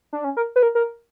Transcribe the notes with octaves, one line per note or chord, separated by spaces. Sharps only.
D4
C#4
A#4
B4
A#4
A#4